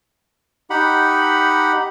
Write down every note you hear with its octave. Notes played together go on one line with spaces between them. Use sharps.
D#4 G4 F#5 B5